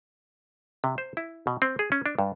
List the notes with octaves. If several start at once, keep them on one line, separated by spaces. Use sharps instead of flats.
C3
C5
E4
B2
C4
G#4
C#4
D4
G2